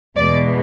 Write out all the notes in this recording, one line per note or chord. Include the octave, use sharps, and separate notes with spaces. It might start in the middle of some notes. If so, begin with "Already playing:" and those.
E2 B2 G#3 B3 D5